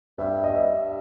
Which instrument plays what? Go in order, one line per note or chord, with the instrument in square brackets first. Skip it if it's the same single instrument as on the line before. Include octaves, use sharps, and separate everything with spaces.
[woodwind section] G2 [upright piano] E5
[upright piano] D#5
[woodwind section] G2 [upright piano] E5